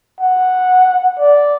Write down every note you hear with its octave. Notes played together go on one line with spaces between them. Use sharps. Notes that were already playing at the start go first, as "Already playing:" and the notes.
F#5
D5